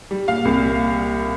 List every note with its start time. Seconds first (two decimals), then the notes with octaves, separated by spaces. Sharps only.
0.11 G3
0.28 A#2 F5
0.45 C2
0.62 A#2